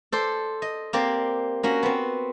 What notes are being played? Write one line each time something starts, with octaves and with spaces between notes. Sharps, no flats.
A4 C5 D5 C6
D#5
A#3 C4 G4 D5
A#3 C#4 F#4
B3 C4